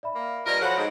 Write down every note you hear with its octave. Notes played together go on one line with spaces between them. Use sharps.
D5 E5 B5
A#3
G2 F3 F4 A#4 D5 D#5
F3 F#3 A4 C#5 F#5 B5
G#2 D7